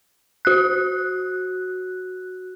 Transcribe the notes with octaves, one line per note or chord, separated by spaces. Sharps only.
F#4 F#6